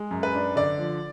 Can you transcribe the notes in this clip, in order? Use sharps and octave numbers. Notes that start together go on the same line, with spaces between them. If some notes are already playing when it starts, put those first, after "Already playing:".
Already playing: G#3
F#2
B4
D4
D3 D5
F3